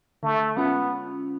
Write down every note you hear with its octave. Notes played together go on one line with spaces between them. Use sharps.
D3 A3
G#3 B3 C#4 F4